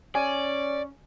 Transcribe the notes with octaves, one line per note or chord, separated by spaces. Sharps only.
C#4 D5 G#5